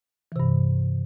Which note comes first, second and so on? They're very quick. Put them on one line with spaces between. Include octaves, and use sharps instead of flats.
E3 C3 G2